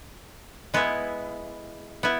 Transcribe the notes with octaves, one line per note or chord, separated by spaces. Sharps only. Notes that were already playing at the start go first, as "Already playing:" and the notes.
G#3 B3 E4
B3 E4